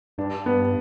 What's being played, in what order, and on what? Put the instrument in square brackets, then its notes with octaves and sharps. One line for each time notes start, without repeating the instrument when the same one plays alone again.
[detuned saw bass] G2 [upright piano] D4
[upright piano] B3